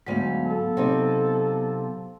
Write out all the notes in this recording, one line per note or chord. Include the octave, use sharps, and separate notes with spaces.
D2 G#2 F#3 B3 F5
A4
C3 D#4